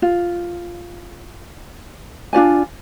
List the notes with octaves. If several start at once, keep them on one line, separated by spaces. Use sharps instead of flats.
F4
D4 F4 D5 G#5